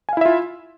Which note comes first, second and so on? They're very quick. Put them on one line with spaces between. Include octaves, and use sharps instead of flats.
G#5 F5 E4 E5 F4